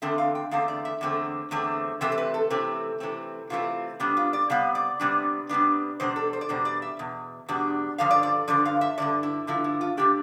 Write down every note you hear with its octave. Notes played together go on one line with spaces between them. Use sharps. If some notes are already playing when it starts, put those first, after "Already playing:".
E2 D3 A3 C4 E5
F5
G5
E2 D3 A3 C4 F5
D5
E5
E2 D3 A3 C4
E2 D3 A3 C4
C3 E3 A3 C4 E5
C5
B4
A4
C3 E3 A3 C4
C3 E3 A3 C4
C3 E3 A3 C4 F4
C3 G3 B3 D4
F4
D5
C3 G3 B3 F5
D5
C3 G3 B3 D4
C3 G3 B3 D4
E2 B2 G3 D4 C5
A4
C5
D5
E2 B2 G3 D4 C5
D5
E5
E2 B2
E2 B2 G3 D4
G2 D3 F3 F5
D5
D5
G2 D3 F3 D5
F5
E5
G2 D3 F3 D5
E4
G2 D3 F3 E4
E4
F4
C3 E3 A3 D4 G4